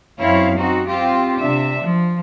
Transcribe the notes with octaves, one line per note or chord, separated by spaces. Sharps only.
F#2 C4 E4 C#5 F5
C4 D#4 F#4
C4 F4 G4
C3 D4 E5
F3